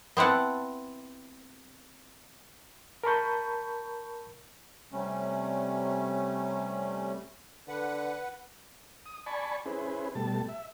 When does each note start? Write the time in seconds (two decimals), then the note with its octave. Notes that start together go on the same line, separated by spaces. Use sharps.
0.17 B3 C4 E4 F#5 A5
3.04 A#4 A5 B5 C#6 G6
4.93 C3 G3 A3 C#4
7.68 D3 B4 F#5
9.06 D#6
9.26 D5 G#5 A5 B5 C#6
9.66 C#4 E4 G#4 B4 C5
10.15 B2 G3 A3 A5
10.49 E5